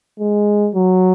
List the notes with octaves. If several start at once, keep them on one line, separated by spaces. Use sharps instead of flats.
G#3
F#3